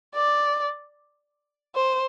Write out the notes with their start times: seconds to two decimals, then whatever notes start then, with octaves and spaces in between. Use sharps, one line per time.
0.15 D5
1.75 C5